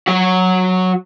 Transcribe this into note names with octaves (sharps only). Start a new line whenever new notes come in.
F#3 F#4